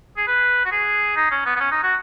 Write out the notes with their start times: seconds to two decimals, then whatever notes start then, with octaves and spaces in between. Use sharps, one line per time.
0.17 G#4
0.28 B4
0.65 F#4
0.72 G#4
1.16 D#4
1.31 C#4
1.45 B3
1.56 B3
1.60 C#4
1.71 D#4
1.83 F#4